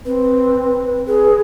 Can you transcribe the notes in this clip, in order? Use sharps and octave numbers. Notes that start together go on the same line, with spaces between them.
C4 B4
G#4 B4